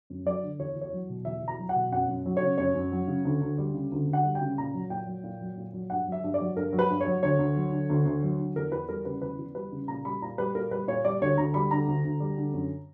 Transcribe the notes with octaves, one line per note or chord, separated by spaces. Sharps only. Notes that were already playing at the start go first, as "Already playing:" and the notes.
F#2
F#3 D5
D3
E2 C#5
E2
C#5
F#3
B2
E2 E5
E2
A#5
F#3
F#5
B2
F#2 F#5
F#2
F#3
C#3 C#5
F#2 C#5
F#2
F#3
C#3
D2
D2
G3
C#3
D2
D2
F#5
G3
G5
C#3
A#2 A#5
F#3
A#2 G5
F#3
A#2
F#3
A#2
F#3
G2 F#5
F#3 E5
G2
D5
F#3
G2 A#4
F#3
B4
G2
C#5
F#3
D2 C#5
D2
F#3
D3
D2
D2
F#3
D3
E2 A#4
E2 B4
G3 A#4
C#3 B4
E2 B4
E2
G3 B4
C#3
A#2 A#5
G3 B5
A#2 A#5
G3 B4
A#2 A#4
G3 B4
A#2 C#5
G3 D5
D2 C#5
D2 A#5
G3 B5
D3 A#5
D2
D2
G3
D3
F#2